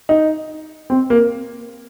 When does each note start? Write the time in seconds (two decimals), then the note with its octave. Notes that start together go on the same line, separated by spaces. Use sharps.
0.09 D#4
0.90 C4
1.10 A#3